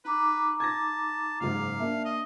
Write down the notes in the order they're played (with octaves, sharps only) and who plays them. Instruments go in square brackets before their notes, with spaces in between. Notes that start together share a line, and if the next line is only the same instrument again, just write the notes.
[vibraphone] D#4 A#5 D6 [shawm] B4
[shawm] A5 [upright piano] G#6 A#6
[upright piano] F#1 G#2 [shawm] F5
[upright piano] A#3 D4 [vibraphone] E5 A5
[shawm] D#5